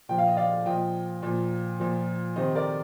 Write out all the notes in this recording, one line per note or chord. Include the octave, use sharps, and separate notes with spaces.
A#2 F3 G5
F5
D#5
D5 F5
A#2 F3 D#5 G5
A#2 F3
A#2 F3
C3 D#3 C5 D#5
A#4 D5